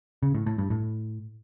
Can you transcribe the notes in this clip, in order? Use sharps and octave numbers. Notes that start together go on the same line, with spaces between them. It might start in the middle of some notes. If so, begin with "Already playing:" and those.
C#3
A2
A2
G2
A2